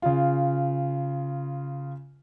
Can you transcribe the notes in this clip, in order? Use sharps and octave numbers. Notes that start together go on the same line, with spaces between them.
C#3 F4